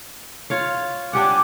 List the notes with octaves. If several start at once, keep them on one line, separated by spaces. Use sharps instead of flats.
F4 C#5 F5
D4 G4 F#5 G#5 D6